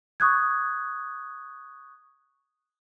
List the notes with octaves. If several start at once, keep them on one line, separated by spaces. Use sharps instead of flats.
C#6 D#6 F#6 G#6